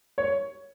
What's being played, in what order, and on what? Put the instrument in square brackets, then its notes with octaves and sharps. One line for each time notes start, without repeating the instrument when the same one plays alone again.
[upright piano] C#5